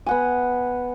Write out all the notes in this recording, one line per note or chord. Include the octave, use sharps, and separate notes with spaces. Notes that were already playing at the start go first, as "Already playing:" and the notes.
B3 F#5 G#5